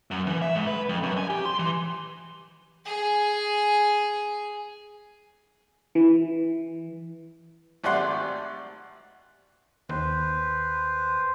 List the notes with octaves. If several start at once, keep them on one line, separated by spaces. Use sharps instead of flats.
F#2
E3
E5
G#2
B4
F2
F#2
G#5
G4
C6
E3
G#4 G#5
E3
G#1 A3 G4 D5 F#5 C6
D#2 B4 C5